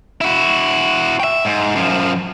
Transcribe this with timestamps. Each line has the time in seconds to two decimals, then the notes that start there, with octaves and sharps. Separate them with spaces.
0.21 E4 F#4
1.20 E5 G5
1.45 G#2
1.76 F#2 F3